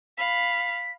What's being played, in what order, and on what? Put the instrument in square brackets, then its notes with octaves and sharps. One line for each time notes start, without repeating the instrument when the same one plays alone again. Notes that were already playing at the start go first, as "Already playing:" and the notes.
[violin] F5 B5 [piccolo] B6